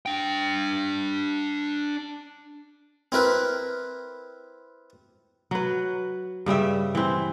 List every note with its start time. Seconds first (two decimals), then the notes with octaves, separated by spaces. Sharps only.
0.06 D4 G5
3.12 C4 E4 A#4 B4
5.51 F#3 B4
6.46 G2 C#3 G3 E5
6.95 E3 C4